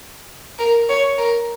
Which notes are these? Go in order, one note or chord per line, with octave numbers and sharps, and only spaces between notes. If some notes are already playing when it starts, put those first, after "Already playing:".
A#4
C#5
A#4